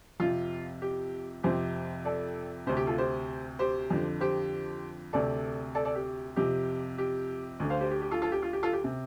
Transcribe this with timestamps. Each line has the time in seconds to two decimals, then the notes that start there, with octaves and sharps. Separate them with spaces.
0.20 F2 C3 F4
0.82 G4
1.43 F2 C3 G4 C5
2.05 A4 D5
2.67 D2 C3 G4 C5
2.77 G4
2.87 F4 A4
2.98 G4 C5
3.59 G4 C5
3.90 F2 D3
4.21 G4 C5
5.13 D2 C3 A4 D5
5.75 A4 D5
5.85 A4 D5
5.95 G4
6.36 F2 C3 G4
6.98 G4
7.60 D2 D3
7.70 C5 F5
7.81 G4 C5
7.91 G4
8.02 G4
8.11 F4 A4
8.22 F4 A4
8.32 G4
8.42 F4
8.53 G4
8.63 F4 A4
8.73 G4
8.84 C3